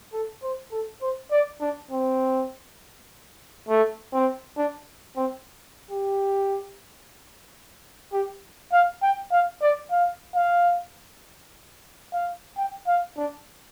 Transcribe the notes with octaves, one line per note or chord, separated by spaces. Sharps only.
A4
C5
A4
C5
D5
D4
C4
A3
C4
D4
C4
G4
G4
F5
G5
F5
D5
F5
F5
F5
G5
F5
D4